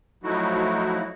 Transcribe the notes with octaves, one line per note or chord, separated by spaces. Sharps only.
F3 F#3 A3 D#4 E4 F#4